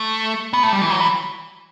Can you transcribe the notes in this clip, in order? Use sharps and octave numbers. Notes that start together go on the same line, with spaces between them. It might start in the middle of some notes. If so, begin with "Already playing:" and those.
Already playing: A3
B3
A3
G3
E3
F#3
E3